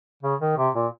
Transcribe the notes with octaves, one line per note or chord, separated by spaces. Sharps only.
C#3
D#3
C3
A#2